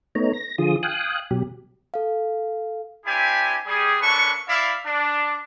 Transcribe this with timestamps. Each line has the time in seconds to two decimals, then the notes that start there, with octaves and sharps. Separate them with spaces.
0.15 A3 B3 D#4 C#5 A#5
0.33 A#6
0.58 D3 F3 F4 G#4 D#6
0.83 F5 G5 G#5 D#6 F#6
1.31 B2 F#3 G4
1.94 A4 F5
3.06 C4 D4 E4 G4 G5 G#5
3.66 G3 G#4
4.01 A#3 C#4 D4 A4 B4 C#6
4.48 E4 D5 E5 F5
4.86 D4